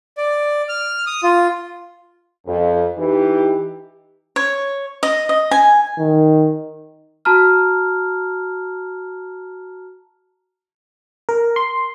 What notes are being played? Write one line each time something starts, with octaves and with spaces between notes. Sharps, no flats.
D5
F6
D#6
F4
F2
E3 D#4 G4
C#5
D#5
D#5
G#5
D#3
F#4 A5 A#5 F6
A#4
C6